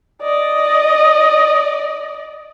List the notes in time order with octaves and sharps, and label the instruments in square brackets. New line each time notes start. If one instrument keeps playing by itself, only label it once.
[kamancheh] D5 D#5